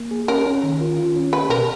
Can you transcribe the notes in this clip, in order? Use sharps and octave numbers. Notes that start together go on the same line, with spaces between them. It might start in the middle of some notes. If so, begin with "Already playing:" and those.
Already playing: A#3
G#4
C#4 A#4
C#4
D#3
F4
F4
C#4
C#4 B4
B2 A#4